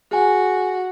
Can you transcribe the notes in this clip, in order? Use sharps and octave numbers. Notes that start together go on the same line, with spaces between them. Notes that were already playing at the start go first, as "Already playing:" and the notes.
F#4 G#4 G#5